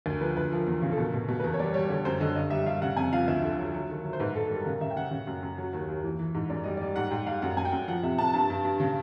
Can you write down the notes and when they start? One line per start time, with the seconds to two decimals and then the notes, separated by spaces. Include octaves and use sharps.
0.06 D2 A#4
0.20 F3 B4
0.37 D2 B4
0.51 F3 A#4
0.67 E2
0.82 C#3
0.92 A4
0.98 B2 A#4
1.14 B2
1.28 B2
1.40 B4
1.44 E2 A#4
1.54 C#5
1.59 G3 D5
1.74 G3 C#5
1.89 D3 C#5
2.05 F#2 C5
2.21 D3 D#5
2.35 G2 D#5
2.50 G3 E5
2.66 G3 F5
2.82 C#3 F#5
2.97 F2 G#5
3.13 F3 F5
3.28 D2 E5
3.43 D3
3.59 F#3
3.74 F#3
3.90 D#3
4.04 F#3
4.13 C5
4.20 G#2 B4
4.35 G#2 A4
4.46 A4
4.50 G3 A#4
4.66 C#3 A#4
4.81 C#3 E5
4.90 G5
4.96 C#3 F#5
5.11 C#3
5.27 F#2
5.43 F#2
5.58 F#3
5.73 D#2
5.88 D#2
6.04 E3
6.19 E3
6.34 G#2
6.50 F#2 D5
6.64 G3 D#5
6.77 G3 D5
6.96 G#2 F#5
7.11 G#2 G5
7.26 G3 F5
7.42 F#2 F#5
7.57 F#2 G#5
7.65 G5
7.73 F#2
7.88 F3 F#5
8.03 C3 E5
8.18 C3 A5
8.34 G2 A5
8.50 G2
8.65 G2
8.80 C#3